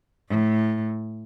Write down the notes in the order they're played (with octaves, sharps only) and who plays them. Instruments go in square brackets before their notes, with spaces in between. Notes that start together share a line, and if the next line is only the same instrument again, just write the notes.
[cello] A2